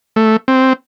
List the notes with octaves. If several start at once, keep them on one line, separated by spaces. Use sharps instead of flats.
A3
C4